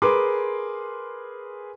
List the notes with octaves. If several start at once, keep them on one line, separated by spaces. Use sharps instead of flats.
G#4 A#4 B4 G#5 C6 D6